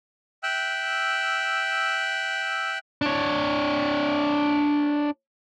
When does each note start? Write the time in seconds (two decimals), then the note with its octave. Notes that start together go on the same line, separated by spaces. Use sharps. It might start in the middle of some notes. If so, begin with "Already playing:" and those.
0.43 E5 G5 E6 F#6
3.02 D4 C#5